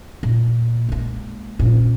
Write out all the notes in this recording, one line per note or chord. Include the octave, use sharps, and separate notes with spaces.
A#2
G#3 A#3
A#2 C#4